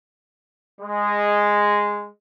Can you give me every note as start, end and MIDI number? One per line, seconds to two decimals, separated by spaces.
0.81 2.09 56